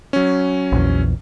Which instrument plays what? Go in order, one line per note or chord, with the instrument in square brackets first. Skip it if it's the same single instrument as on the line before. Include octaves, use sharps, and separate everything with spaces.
[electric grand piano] F#3 C#4
[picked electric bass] A#1 E2